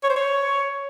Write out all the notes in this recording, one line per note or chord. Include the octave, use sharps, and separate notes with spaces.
C#5
C5
C#5